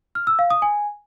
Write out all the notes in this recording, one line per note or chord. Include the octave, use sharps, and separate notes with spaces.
F6
E6
F5
D#6
G#5